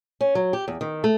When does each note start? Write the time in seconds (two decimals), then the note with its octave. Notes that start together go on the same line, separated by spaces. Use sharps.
0.21 C#4
0.35 F#3
0.53 G4
0.68 E2
0.81 D#3
1.04 A3